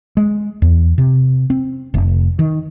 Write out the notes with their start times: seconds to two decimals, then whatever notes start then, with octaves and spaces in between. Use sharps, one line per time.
0.17 G#3
0.62 E2
0.98 C3
1.50 C4
1.94 F1
2.39 D#3